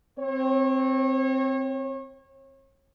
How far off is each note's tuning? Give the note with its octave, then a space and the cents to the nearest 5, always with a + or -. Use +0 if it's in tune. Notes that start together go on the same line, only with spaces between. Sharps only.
C4 +0 C#5 -35